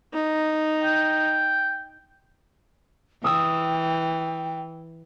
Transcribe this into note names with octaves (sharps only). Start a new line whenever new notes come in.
D#4
G5
E3 G5 D#6 E6